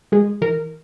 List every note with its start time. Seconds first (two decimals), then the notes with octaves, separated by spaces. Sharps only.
0.12 G#3 G#4
0.42 E3 A#4